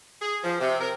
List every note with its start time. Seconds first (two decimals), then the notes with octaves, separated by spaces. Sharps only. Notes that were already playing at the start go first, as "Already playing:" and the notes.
0.22 G#4
0.44 F3
0.61 C3
0.80 A#4